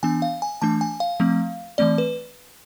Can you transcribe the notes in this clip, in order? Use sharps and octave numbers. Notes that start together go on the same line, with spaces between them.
E3 B3 D4 G#5
F5
G#5
E3 A3 D4 A5
G#5
F5
F3 A3 C4
E3 A3 C4 D5
B4